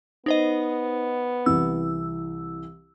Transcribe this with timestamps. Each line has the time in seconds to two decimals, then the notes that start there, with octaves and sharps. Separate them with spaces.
0.26 B3 D#4 C5 D#5
1.46 C2 E3 E6